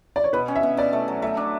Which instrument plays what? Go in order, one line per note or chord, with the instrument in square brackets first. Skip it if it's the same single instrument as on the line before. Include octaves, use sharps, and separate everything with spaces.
[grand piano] D5
C#5
[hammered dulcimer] B2 [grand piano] B4
[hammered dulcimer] C#4
[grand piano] E5
[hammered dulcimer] B2
[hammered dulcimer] B2 [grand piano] D5
[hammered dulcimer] A3
F#3
[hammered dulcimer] A3 [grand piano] E5
[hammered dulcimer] D4